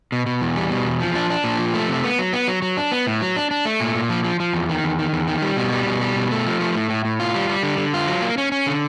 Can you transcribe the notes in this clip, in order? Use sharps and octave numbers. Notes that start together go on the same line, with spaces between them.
B2
B2
E2
G3
B2
E2
F3
D4
D4
A#2
F3
A3
C3
B3
F#3
B3
F#3
F#3
D4
B3
A2
F#3
D4
D4
A3
A#2
A#2
F3
F3
F3
E2
D#3
E2
D#3
E2
D#3
G3
B2
G3
B2
G3
B2
A3
F3
A3
A2
A2
A2
F4
G3
G3
D3
D3
F4
F#3
A#3
C#4
C#4
D3